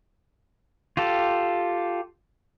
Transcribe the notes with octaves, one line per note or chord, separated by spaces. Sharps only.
F4 G4 A4